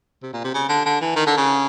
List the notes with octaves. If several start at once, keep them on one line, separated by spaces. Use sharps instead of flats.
C3
A#2
C3
C#3
D3
D3
E3
D#3
D3
C#3